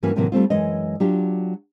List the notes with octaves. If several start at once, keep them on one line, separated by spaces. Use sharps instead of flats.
G2 E3 A#3 C#4 F#4 B4
A2 C3 D#3 E3 F#3 A#3
G3 A3 C4 F4
F#2 E3 G#3 D#5
F#3 D4 F4 G4